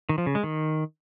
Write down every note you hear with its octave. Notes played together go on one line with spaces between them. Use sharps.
D#3
F3
C#3
G#3
D#3